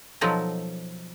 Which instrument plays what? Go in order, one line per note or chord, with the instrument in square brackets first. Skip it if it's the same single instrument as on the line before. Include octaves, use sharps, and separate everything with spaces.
[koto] B2 F3 F#3 D#4 A4